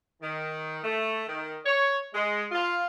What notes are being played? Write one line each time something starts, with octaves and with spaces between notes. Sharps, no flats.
D#3
A3
D#3
C#5
G#3
F4